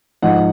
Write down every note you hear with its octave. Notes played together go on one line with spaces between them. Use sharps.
G#2 F3 D#5 F#5